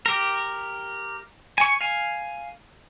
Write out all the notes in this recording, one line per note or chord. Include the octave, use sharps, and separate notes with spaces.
G4 A#4
G#5 C#6
F5 G#5